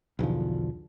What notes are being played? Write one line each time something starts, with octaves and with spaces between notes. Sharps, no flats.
B1 E2 D3 F3